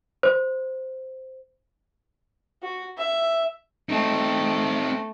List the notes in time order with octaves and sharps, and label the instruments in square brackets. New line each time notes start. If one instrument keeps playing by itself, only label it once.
[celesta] C5
[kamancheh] F#4
E5
[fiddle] A3 [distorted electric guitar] C4 D#4